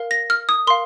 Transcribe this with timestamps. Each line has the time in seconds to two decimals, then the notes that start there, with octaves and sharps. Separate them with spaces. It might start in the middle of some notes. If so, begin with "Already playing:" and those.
Already playing: A#4 F5
0.11 A#6
0.30 F6
0.49 D#6
0.67 A#4 F5 C6